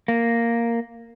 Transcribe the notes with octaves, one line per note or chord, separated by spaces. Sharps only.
A#3